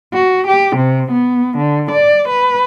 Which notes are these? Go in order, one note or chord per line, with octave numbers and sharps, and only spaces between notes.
F#4
G4
C3
B3
D3
D5
B4